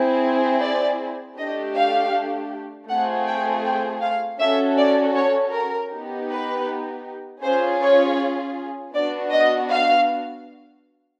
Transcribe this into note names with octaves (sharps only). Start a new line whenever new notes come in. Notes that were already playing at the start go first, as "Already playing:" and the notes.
Already playing: C4 E4 G#4
D5
A3 D4 G4 D#5
F5
A3 C4 F4 G#4 F#5
G5
G5
F5
C#4 F#4 A4 E5
D5
C#5
A#4
B3 D#4 G4
B4
C#4 F4 G#4 C5
C#5
B3 D4 F#4 D5
D#5
F5